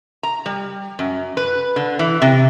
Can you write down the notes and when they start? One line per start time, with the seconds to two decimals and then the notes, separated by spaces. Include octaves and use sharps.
0.23 A#5
0.46 G3
0.99 F#2
1.37 B4
1.76 D3
1.99 E3
2.22 C3